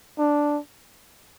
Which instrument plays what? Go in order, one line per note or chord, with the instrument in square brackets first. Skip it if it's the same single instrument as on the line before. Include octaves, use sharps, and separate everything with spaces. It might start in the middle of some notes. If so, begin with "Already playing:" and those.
[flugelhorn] D4